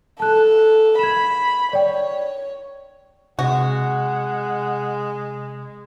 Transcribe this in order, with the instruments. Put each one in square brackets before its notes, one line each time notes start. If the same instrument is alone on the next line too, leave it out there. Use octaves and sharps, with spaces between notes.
[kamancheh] A4 [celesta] A5 F#6
[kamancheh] B5 [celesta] G#6 E7
[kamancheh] C#5 [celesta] D5 G5
[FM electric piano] C3 [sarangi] G#3 [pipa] F#4 [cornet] F#5